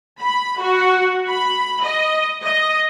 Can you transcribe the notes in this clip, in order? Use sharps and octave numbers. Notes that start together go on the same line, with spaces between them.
B5
F#4
B5
D#5
D#5